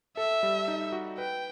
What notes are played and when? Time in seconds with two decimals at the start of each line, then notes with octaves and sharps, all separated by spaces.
0.17 A4 E5
0.43 G3
0.68 D#4
0.92 F#4
1.18 B4 G5